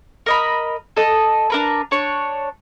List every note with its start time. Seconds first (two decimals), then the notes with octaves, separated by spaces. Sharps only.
0.26 A#4 D#5 B5
0.97 A4 D#5
1.50 D4 A#4 B4
1.91 D4 C#5